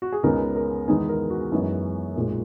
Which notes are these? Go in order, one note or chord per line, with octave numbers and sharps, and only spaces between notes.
F#4
G#4
C#2 C#3 G#3 B3 D#4 A#4
A#4
E2 D#3 G#3 B3 D#4 G#4
A#4
F#4
F#2 E3 G#3 B3 D#4
B1 A#2 G#3